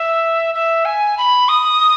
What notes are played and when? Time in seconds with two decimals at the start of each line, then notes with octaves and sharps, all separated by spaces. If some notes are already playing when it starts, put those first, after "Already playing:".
Already playing: E5
0.54 E5
0.85 G#5
1.17 B5
1.48 D#6